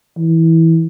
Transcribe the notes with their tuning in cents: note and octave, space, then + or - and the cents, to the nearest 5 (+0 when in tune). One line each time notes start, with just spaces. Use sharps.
E3 -15